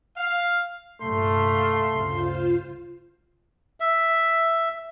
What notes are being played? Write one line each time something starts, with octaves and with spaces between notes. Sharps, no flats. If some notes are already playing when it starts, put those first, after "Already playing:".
F5
C2 G2 A#2 A3 F5 C6
G1 D2 C#3 F4 C5
E5